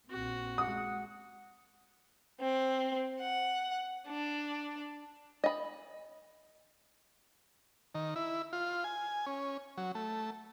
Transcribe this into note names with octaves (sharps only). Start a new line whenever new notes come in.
A#1 C4 F#4
G#3 F#5 D#6
C4
F#5
D4
D#5 B5
D#3
E4
F4
G#5
C#4
F#3
A3